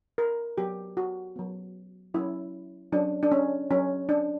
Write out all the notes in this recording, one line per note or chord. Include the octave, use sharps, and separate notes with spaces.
A#4
F#3 B3 G4
F#4
F#3 B3
F#3 C#4 E4
F#3 C#4 D4
D4
C#4
F#3 C#4
D4